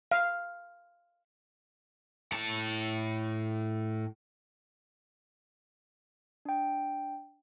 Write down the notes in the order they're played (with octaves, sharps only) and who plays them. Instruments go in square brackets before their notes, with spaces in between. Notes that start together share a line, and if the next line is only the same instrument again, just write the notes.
[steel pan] F5
[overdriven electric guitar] A2 A5
[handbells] D4 G5